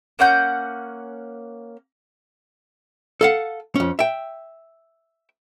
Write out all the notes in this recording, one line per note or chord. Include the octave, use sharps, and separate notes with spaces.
A#3 C#4 F#5 G6
A4 F5 F#5
F2 C#4
E5 G5